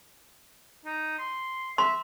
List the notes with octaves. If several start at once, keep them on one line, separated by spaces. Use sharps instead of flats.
D#4
C6
E5 C6